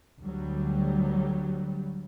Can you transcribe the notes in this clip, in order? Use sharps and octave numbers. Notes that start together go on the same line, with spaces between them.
D2 F#3 G3